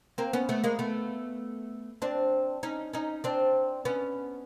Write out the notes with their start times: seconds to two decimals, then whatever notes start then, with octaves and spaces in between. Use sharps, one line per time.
0.18 A#3 C4
0.33 B3 C#4
0.49 A3 B3
0.64 G#3 A#3
0.79 A3 B3
2.02 C4 D4
2.63 C#4 D#4
2.93 C#4 D#4
3.24 C4 D4
3.85 B3 C#4